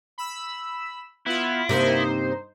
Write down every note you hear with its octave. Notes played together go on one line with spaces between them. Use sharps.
B5 E6
B3 E4 F4
G2 C3 A#3 D#4 C5